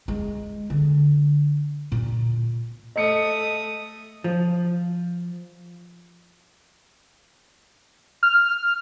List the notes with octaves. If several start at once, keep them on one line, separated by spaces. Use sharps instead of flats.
G#3
D3
A#2
A3 D#5 D#6 C#7
F3
F6